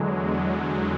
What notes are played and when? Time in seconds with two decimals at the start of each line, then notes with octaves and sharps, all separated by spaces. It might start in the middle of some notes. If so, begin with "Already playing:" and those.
Already playing: E2 D3 F#3 G#3
0.29 F#3